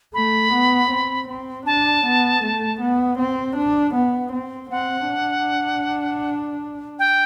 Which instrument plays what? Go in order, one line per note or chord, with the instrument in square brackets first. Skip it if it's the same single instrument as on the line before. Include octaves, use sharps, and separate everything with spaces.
[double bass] A3 [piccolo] B5
[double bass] B3
C4
C4
[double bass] D4 [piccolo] A5
[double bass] B3
A3
B3
C4
D4
B3
C4
[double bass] C4 [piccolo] F#5
[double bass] D4
[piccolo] G5